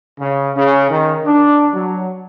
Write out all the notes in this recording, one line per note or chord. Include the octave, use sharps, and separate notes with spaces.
C#3
C#3
D#3
D4
F#3